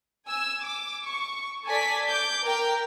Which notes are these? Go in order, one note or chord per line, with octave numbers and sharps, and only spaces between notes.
G#5 E6
D6
C#6
A4 D5 G#5 B6
D6 G6
A#4 G5